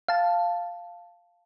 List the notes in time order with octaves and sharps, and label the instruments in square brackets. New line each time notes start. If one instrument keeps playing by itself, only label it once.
[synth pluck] F5 A5